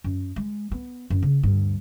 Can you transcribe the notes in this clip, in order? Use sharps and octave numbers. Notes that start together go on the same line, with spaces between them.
F#2
G#3
B3
F#2
C#3
D2 G2